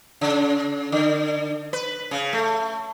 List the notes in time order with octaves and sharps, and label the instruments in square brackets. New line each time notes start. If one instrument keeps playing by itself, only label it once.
[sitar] C#3
D3
B4
C#3
A3